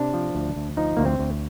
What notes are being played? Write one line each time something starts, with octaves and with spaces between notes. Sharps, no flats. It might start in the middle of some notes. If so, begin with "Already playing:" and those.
Already playing: C3 D4
F3
D2
D2
F3 D#4
D2 A#3
C4
D2